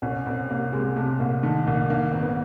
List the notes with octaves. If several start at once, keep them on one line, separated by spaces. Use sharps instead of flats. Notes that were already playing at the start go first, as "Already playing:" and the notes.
C2 C#4
C2 C4
C3 A#3
C3 G#3
C3 A3
C2 A#3
D#3 A3
C2 A#3
D#3 A#3
G#1 C4
B3